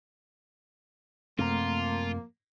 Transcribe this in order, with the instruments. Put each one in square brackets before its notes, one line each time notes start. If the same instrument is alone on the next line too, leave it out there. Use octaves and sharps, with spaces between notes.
[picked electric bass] F#2 C3 C4 [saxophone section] F3 A#3 [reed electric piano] A3 A#5 [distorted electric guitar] F4